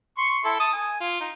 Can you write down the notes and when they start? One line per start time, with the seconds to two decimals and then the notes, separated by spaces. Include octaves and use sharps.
0.18 C6 C#6
0.45 E4 A4
0.60 A5 D#6
0.73 G#5
1.01 F4
1.21 D#4